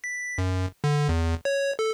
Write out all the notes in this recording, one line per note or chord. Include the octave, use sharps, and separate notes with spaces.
B6
F#2
D3
E2
C#5
A4